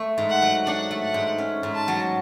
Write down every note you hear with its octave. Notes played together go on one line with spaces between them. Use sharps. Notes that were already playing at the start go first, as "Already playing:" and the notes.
Already playing: A3
G#2
F#5
F#3
D4 F#5
A3
F#5
G#2
C#4
G#2
A5
F#3